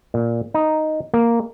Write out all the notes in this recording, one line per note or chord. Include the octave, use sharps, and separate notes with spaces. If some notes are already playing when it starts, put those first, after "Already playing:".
A#2
D#4
A#3